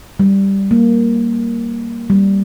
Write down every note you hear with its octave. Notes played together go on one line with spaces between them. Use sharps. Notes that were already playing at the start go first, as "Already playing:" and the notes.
G3
A#3
G3